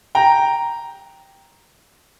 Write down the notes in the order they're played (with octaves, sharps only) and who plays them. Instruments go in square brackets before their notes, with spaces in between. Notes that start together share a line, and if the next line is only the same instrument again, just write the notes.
[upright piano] G5 A#5